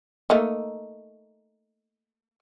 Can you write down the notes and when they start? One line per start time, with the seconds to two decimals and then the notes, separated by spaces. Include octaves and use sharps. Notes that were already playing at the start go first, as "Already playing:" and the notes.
0.30 A3 A#3 D#4